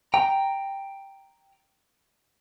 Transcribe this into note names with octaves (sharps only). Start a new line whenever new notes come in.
G5 A#5